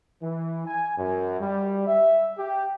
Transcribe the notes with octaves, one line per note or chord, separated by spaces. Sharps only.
E3
G#5
F#2
G3
E5
G4